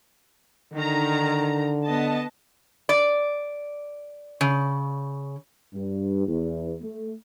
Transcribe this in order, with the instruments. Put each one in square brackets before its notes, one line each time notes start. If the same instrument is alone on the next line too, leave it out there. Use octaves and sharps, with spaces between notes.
[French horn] D3 [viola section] D#3 A#5
[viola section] B3 D#5 A5
[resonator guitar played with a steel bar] D5
C#3
[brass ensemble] G2
E2
A3